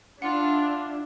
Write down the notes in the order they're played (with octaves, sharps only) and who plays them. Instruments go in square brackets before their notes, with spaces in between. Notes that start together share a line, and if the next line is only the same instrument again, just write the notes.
[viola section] D4 E4 [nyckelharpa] F4 [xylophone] F#5